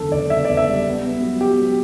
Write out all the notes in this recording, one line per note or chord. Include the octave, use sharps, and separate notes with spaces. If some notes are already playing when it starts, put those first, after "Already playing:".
Already playing: F#1 E2 D3 A4
F#1 D5
E2 E5
E2 D5
E5
G3
B3
B3
F#3
B3 G4
F#3